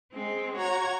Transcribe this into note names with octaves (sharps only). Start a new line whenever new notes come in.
G#3 C4
F#4 C#5 A#5 G#6